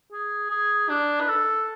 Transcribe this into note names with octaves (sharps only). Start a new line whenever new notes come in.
G#4
G#4
D4
B4
A4